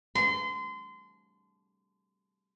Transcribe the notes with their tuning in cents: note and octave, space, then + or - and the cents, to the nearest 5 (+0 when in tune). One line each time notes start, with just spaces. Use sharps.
C6 -30